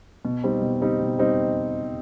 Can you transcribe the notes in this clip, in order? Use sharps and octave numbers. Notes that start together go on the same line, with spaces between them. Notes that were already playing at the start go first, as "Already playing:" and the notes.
B2
G3 C4 D#4
B2
G3 C4 D#4
B2
G3 C4 D#4